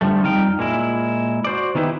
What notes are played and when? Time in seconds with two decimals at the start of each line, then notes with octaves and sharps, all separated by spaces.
0.01 D3 F3 G3 A3
0.22 F2 G3 D#4 F5 G5
0.59 A#2 G#3 E4
1.44 F#4 C5 D5
1.75 D#3 B3 D#4 E4 G4 B4